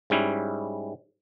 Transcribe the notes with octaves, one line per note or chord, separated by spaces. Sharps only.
G#2 G3 C#4 E4